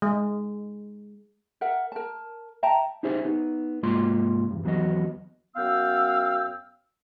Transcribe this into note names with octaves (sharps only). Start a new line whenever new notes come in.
G#3
A#4 E5 F#5
A#4 A5
E5 G5 A5 A#5
D#4 E4 G4 G#4 C5 E5
B3 D#4
C2 G#2 G#3 A#3 F4 C6
E2 G2
D#2 E3 F#3 B3 F#4 D#5
F#2 B3 F5 G5 E6